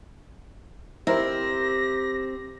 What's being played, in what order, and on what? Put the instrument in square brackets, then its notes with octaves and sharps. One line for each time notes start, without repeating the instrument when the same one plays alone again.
[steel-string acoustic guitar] C4 [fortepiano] E4 A#4 C5 [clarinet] G4 [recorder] A#6